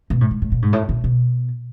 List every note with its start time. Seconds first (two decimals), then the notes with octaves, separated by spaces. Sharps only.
0.10 B2
0.21 A2
0.31 G#2
0.42 A2
0.52 A#2
0.62 G#2
0.73 A2
0.89 A#2
1.04 B2